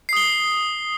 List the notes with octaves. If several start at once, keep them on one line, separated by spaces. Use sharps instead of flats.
D#6 C7 G7